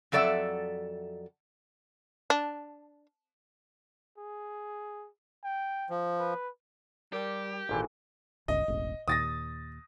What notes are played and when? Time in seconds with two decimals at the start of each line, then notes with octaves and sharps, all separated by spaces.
0.12 F2 F#3 A4 D5 E5 F#5
2.30 D4
4.18 G#4
5.44 G5
5.90 F3
6.20 B4
7.13 G3 G4 A#4 A5
7.69 G#1 A#2 E3 A4 G5 G#5
8.48 G1 C#2 D#5
8.68 E1 A1
9.08 D#2 A#2 D#6 A6 A#6